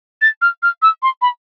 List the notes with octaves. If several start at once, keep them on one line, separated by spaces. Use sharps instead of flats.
A6
F6
F6
E6
C6
B5